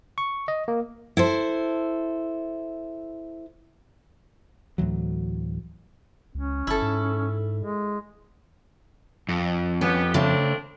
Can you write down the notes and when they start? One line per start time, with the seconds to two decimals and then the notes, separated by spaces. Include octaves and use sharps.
0.18 C#6
0.48 D#5
0.68 A#3
1.17 E4 A4 C5
4.78 D2 A2 E3 F#3
6.35 C#2 C#4
6.67 G1 E4 A4
6.82 G#2
7.61 G#3
9.29 F2
9.81 B3 C#4 G4
10.14 C#3 F3 A3 C4 D4